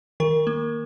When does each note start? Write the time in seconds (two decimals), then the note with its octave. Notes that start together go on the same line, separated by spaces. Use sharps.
0.20 D#3 A#4
0.47 A#3